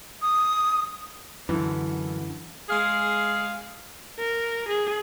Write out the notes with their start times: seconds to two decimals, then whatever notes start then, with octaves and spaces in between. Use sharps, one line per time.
0.22 D#6
1.49 F#2 D3 E3
2.69 G#3 G#4 F5
4.19 A#4
4.68 G#4